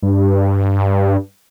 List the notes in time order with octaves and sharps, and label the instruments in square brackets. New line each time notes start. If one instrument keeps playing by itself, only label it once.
[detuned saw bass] G2